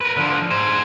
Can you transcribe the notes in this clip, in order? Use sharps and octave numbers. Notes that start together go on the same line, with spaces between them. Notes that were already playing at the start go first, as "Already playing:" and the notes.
A#4 B4
D3 F3
G#4 C5